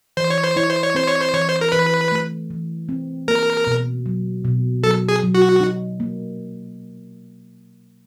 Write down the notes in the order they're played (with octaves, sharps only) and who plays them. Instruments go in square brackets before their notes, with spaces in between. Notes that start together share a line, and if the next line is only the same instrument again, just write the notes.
[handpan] E3 [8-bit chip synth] C5
[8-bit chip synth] C#5
C5
[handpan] E4 [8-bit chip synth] C#5
[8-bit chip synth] C5
C#5
[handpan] C4 [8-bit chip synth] C5
[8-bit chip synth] C#5
C5
[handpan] E3 [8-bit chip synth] C#5
[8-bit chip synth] C5
A#4
[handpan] E3 [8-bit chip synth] B4
[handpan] A3
E3
C4
[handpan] A#3 [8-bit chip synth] A#4
[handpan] B2
F#3
B2
[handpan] F#3 [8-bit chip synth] A4
[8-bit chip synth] G#4
[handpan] F#3
[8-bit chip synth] F#4
[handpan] D#4
A#3